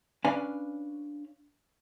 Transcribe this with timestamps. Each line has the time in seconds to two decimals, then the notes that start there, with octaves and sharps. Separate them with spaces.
0.25 C#4 D4 B4 F5 G#5